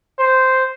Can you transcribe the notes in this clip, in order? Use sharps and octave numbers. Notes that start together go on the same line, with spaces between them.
C5